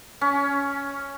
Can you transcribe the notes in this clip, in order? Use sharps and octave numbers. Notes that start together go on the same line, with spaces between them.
C#4